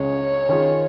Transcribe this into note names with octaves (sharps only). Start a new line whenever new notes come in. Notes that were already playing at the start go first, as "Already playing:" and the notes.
Already playing: C#2 C#3 G#3 C#4 G#4 C#5
D#3 C#4 F4 G#4